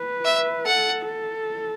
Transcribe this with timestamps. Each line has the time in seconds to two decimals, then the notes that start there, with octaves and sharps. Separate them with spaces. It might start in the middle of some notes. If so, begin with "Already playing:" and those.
Already playing: B4
0.25 E5
0.65 A4 F#5
1.06 A4